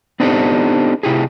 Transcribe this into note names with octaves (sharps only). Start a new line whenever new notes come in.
B3 C4 D4 D#4 G4 A4
C3 E4 G4 G#4